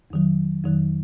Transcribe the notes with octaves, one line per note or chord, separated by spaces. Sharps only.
F2 D#3 F#3
F2 D#3 F#3